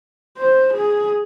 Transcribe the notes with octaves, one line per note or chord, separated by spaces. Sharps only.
C5
G#4